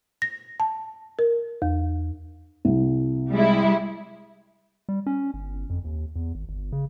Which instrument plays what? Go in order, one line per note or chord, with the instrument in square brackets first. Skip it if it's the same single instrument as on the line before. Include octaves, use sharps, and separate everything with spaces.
[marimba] A#6
A5
A#4
E2
[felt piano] C2
[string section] G3 G#3 E4
[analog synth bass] G3
C#4
G1
F2
D#2
E2
G#1
G1
C#3